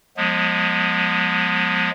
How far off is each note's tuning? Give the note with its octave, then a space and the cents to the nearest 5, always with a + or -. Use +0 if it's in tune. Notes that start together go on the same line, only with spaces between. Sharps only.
F3 +40 G#3 +0 B3 -25